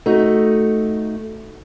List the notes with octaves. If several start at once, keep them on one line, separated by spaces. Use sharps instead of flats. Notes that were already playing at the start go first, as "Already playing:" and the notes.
A3 D#4 F#4